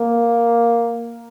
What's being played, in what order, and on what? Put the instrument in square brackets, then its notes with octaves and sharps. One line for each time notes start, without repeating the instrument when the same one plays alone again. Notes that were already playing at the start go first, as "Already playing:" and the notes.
Already playing: [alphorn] A#3